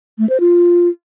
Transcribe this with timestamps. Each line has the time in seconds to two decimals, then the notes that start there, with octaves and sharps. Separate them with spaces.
0.19 A3
0.29 C5
0.40 F4